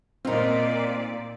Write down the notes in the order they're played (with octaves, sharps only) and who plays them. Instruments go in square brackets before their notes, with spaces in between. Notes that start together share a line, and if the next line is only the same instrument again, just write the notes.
[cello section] A#2 D5 [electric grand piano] C4 A#4 [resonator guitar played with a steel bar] D#4 F4